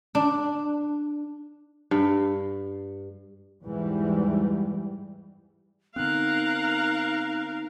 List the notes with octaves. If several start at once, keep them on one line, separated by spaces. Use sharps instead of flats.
D4
G2
E2 G#2 E3 G3
D3 B3 C4 D#4 A#4 F5 F#6